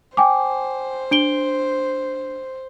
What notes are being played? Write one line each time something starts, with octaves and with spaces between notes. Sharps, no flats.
C5 G5 G#5 D6
D4 D7 G7